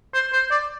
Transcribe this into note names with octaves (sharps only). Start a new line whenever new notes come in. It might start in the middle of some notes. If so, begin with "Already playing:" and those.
C5
C5
D5